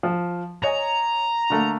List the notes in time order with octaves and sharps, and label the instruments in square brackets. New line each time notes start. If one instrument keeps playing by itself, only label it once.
[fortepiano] F3
[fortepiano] C#5 D#5 G#5 [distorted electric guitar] A#5
[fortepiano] D3 A3 A#3